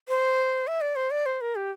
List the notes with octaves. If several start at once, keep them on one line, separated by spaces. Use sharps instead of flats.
C5
E5
D5
C5
D5
C5
A#4
G4